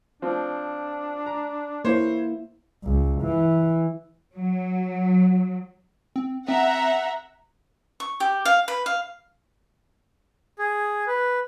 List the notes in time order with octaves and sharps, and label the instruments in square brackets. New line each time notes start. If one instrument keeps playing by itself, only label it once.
[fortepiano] F3 C4 [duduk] D4
[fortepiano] A#5
[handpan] A#3 E4 [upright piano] C5 [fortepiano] C#5
[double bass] C#2
E3
[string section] F#3
[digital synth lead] C4
[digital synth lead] C4 [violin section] E5 F#5 A#5
[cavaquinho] C#6
G4
F5
B4
F5
[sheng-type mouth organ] G#4
B4